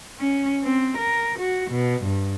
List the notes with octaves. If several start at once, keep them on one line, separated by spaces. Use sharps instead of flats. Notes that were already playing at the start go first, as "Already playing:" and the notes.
C#4
C4
A#4
F#4
B2
G2